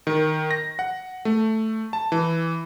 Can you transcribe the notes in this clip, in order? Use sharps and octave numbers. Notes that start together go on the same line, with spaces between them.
D#3
A#6
F#5
A3
A5
E3